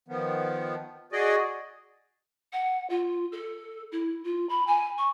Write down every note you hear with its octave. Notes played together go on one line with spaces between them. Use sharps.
D#3 F3 B3
F#4 G#4 D5 D#5
F#5
F4
A4
E4
F4
B5
G#5
C#6